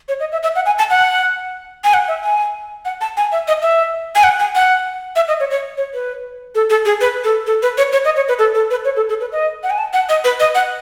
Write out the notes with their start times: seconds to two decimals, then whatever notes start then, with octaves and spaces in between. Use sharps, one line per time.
0.09 C#5
0.20 D#5
0.32 E5
0.43 E5
0.56 F#5
0.66 G#5
0.79 A5
0.90 F#5
1.84 G#5
1.94 F#5
2.08 E5
2.24 G#5
2.85 F#5
3.01 A5
3.17 G#5
3.32 E5
3.48 D#5
3.62 E5
4.15 G#5
4.24 F#5
4.39 G#5
4.55 F#5
5.16 E5
5.28 D#5
5.40 C#5
5.50 C#5
5.78 C#5
5.94 B4
6.55 A4
6.70 A4
6.85 G#4
7.01 B4
7.24 A4
7.47 A4
7.63 B4
7.78 C#5
7.93 C#5
8.05 D#5
8.16 C#5
8.28 B4
8.39 A4
8.55 A4
8.71 B4
8.85 C#5
8.96 A4
9.09 A4
9.21 B4
9.32 D#5
9.63 F#5
9.70 G#5
9.78 A5
9.93 F#5
10.09 D#5
10.24 B4
10.40 D#5
10.55 F#5